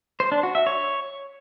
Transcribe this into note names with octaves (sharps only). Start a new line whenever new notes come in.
C5
D4
F#4
E5
C#5